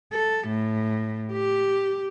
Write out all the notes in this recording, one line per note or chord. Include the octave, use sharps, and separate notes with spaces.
A4
A2
G4